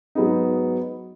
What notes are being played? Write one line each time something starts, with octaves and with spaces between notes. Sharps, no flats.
G#2 F#3 B3 D#4